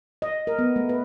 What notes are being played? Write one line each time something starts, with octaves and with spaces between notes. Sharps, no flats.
D#5
A#4
B3
A3
B4